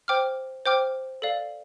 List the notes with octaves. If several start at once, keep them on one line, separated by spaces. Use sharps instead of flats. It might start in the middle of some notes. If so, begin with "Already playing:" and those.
C5 G5 D6 F6
C5 G5 D6 F6
A4 D5 F5